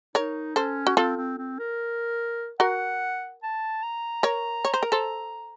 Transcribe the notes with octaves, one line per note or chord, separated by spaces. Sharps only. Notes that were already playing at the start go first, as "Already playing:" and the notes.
D#4 A#4 C#5
C#4 A4 C5
F#4
C4 F4 A4
C4
C4
A#4
F#4 A#4 F#5
A5
A#5
A#4 C#5
C#5
C5
A#4
A4 C5